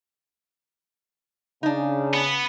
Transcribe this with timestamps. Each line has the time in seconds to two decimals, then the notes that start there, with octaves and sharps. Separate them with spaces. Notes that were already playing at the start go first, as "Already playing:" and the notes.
1.63 C#3 D4 D#4
2.14 B3